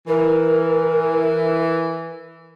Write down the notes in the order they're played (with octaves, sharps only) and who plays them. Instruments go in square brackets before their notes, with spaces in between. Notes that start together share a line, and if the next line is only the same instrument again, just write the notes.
[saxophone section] E3 [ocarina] A#4